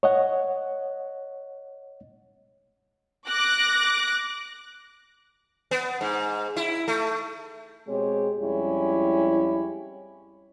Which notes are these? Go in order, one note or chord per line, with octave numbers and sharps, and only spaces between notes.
C#5 D#5 F#5
D6 F#6 A#6
B3
G#2
E4
A3
B2 G#3 C4 G4 C#5
F2 G3 G#3 C#4 E4